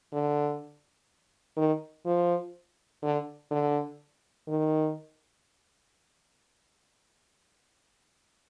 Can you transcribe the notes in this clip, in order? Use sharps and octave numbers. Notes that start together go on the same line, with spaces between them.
D3
D#3
F3
D3
D3
D#3